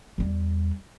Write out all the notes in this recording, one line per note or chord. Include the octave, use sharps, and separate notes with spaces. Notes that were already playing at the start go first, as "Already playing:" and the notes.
E2 G3